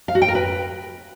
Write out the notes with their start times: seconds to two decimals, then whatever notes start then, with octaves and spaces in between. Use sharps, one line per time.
0.08 F5
0.15 F#4
0.22 G5
0.28 A#4
0.35 B4